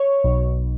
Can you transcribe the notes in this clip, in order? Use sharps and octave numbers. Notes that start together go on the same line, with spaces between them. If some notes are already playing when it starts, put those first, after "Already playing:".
Already playing: C#5
B1